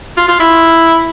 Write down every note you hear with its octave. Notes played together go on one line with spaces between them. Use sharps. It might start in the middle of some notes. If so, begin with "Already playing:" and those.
F4
F4
E4